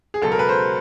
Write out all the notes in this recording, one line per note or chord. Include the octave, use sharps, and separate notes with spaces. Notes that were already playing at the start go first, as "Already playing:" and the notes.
G#4
C#2 B2 F#3 A4
A#4
B4
C5